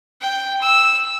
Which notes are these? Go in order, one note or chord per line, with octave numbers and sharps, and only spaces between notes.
G5
E6